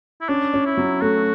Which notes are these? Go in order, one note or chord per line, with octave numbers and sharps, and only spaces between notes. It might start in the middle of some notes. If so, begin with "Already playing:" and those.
E4
C#4 D4
C#4
E4
F#3
A3 F#4